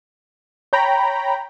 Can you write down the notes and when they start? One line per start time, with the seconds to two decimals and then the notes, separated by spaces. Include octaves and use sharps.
0.73 C#5 G5 A#5 B5